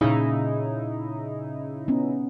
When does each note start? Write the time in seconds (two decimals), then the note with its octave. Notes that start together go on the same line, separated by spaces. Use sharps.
0.01 A#2 C#3 D#4 E4 G#4
1.88 B3 C#4